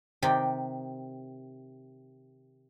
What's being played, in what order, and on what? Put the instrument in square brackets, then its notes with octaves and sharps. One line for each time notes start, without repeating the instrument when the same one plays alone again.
[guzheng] C3 D#3 G4 D5 G5